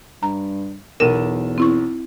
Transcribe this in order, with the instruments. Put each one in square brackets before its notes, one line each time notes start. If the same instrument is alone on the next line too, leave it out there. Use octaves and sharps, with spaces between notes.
[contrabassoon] G2 [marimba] A#5
[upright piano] B1 D#7 E7 [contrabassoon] E2 [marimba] A#4
[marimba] C4 E4 C#6